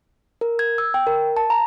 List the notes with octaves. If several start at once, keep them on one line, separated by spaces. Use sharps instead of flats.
A#4
G#6
E6
G5
A#4
A5
A#5